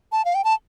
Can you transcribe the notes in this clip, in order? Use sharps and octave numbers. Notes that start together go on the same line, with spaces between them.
A5
F5
G5
A5